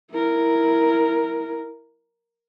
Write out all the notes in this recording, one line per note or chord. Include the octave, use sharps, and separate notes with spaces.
E4 A#4